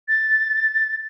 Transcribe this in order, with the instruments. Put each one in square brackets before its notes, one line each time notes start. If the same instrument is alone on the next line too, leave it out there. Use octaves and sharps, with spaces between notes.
[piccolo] A6